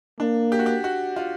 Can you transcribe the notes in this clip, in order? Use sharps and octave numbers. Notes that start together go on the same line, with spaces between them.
A#3 D4
G4
F#4
G4
F#4
F4